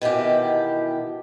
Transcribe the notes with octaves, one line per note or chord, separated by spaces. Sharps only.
B2 D#3 E3 G4